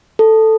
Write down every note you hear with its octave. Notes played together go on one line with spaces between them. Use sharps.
A4